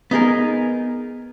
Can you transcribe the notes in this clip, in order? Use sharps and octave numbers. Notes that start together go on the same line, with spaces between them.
B3 D#4 G#4 A#4